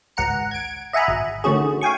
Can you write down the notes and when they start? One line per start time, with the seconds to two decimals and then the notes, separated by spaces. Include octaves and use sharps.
0.17 G#1 C#2 F#5 A#5 C#7
0.51 G#6 D7
0.93 D#5 E5 F#5 G#5 A#5 B5
1.08 G#1
1.44 D3 D#3 A3 C#4 F#4 G#4
1.81 F5 G5 G#5 C#6